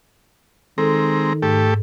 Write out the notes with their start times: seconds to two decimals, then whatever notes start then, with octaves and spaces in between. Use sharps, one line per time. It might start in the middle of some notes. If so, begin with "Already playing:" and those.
0.78 D#3 G#3 C4 A4 A#5
1.42 G#2 A3 G4 A4